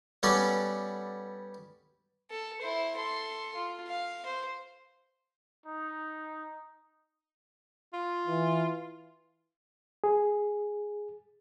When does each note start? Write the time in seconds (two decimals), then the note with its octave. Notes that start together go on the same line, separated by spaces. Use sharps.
0.23 G3 B3 C#4 A4 D5
2.31 A4
2.62 E4 C5
2.97 A4 C6
3.55 F4
3.88 F5
4.26 C5
5.66 D#4
7.93 F4
8.27 E3
10.04 G#4